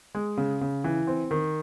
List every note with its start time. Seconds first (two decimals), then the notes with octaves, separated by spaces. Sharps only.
0.15 G#3
0.37 C#3
0.61 C#3
0.84 E3
1.07 C4
1.31 D#3